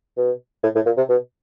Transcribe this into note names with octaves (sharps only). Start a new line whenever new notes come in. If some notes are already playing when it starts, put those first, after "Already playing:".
B2
A2
A2
A#2
C3
B2